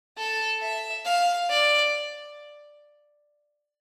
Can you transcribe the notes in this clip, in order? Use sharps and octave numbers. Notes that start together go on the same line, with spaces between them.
A4
E5
F5
D5